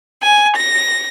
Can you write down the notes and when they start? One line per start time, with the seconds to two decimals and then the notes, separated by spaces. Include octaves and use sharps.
0.23 G#5
0.57 A#6